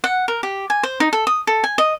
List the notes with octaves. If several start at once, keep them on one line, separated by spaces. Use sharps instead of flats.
F#5
A#4
G4
G#5
C5
D#4
A4
D#6
A4
G#5
D#5